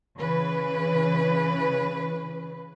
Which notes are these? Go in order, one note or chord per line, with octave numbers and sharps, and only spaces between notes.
C#3 E3 B4